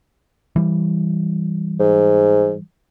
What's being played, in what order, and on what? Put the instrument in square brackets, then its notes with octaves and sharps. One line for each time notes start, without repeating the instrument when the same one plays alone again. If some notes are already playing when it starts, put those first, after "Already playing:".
[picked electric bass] E3 G3
[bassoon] G#2